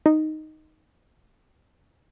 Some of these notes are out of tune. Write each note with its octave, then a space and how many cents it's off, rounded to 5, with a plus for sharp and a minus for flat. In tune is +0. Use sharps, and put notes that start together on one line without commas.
D#4 +0